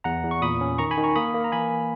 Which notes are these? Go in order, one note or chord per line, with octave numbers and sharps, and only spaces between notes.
E2 F#5 A#5
E2
C#6
A#2 B5 D#6
C#4
D#3 A#5 C#6
G#5 B5
D#3
A#5 C#6
A#3 B5 D#6
A#3
A#5
E3 G#5 B5